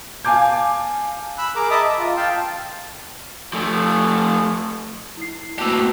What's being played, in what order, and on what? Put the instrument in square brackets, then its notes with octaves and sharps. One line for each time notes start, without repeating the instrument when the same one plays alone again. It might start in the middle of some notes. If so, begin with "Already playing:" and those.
[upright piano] F5 G#5 A5 D6 G6
[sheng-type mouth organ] B5 E6 F#6
G#4 A#4 A#5 D6
D#5 E5 A5 B5 D6 D#6
A5
F4
F5 G5 A5
[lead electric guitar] F3 A3
[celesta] E4 C7
[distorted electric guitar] B2 G4 [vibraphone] A3 A#3 F#4 [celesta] A5 E6